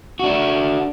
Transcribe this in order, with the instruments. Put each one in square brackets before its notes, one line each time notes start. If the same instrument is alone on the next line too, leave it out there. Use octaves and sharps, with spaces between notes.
[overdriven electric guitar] D4 F#4